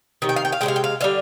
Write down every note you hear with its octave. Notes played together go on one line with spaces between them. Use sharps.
C3 D#3
G5
F5
G5
F5
C3 D#3 G#3 F5 G5
G5
F5
D3 G3 F5